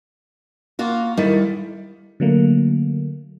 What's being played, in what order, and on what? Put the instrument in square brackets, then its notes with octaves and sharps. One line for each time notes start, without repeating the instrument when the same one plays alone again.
[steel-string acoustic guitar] A#3 F4 F#4
[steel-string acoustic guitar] D#3 [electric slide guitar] G3 E4 A4
[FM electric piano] D3 F#3 A3 A#3